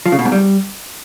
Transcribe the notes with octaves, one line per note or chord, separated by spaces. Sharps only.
F3
C#3
B2
G#2
G3